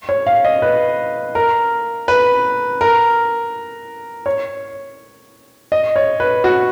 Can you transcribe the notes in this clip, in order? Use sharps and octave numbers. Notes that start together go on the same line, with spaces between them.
C#5
F5
D#5
B4
A#4
B4
A#4
C#5
D#5
C#5
B4
F#4